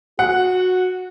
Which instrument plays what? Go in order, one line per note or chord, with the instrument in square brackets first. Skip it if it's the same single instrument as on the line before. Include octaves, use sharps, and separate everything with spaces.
[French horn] F#4 [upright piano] F#5